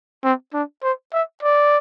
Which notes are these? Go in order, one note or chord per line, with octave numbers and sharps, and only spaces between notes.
C4
D4
C5
E5
D5